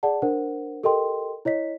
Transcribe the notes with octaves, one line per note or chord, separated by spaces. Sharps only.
G#4 D5 F#5 A5
D4 A#4 C5 F#5
G4 A4 A#4 D#5 G5 C6
E4 C#5 D#5 B6